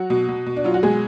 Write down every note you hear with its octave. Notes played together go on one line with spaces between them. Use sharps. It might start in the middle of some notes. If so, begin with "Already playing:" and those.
Already playing: F#3 F#4
B2
B2
B2
D4
F#3 F4
F#4
B2 G#3 G#4